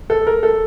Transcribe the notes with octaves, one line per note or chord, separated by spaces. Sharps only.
A4
A#4
A4